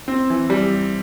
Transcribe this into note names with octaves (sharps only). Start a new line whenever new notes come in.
C4
E3
G3